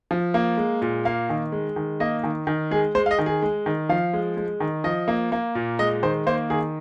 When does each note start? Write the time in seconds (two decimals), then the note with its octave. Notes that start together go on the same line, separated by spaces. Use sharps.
0.11 F3
0.34 A#3
0.57 G#3
0.82 A#2
1.05 A#3 F5
1.30 D#3
1.52 G#3
1.76 D#3
2.00 A#3 D#5
2.24 D#3
2.47 D#3
2.71 G#3 G#4
2.95 G#3 C5
3.06 F5
3.11 D#5
3.19 D#3
3.26 G#4
3.42 G#3
3.66 D#3
3.89 F3 F5
4.13 G#3
4.37 G#3
4.60 D#3
4.84 F3 D#5
5.08 A#3
5.32 A#3
5.55 A#2
5.79 G#3 D#5
6.03 D#3 C5
6.26 A#3 C5
6.50 D#3 G#4